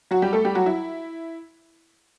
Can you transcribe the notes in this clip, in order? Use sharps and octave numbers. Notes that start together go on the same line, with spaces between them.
F#3 F#4
G3 G4
A3 A4
G3 G4
F#3 F#4
E4